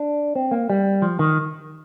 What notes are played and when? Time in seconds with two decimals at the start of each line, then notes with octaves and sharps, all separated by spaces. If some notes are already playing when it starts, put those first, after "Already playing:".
Already playing: D4
0.36 C4
0.51 A#3
0.70 G3
1.02 F3
1.19 D#3